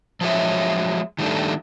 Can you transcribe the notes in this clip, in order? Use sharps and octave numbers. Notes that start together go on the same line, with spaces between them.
F3 F#3 G#3 A#4 C#5 E5
D#3 G3 A3 D4